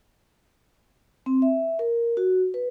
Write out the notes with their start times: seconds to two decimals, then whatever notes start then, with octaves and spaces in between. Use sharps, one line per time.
1.26 C4
1.42 E5
1.79 A#4
2.17 F#4
2.54 B4